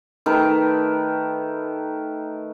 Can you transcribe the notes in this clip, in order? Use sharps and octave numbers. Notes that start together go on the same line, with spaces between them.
D#3 A3 A#4 B4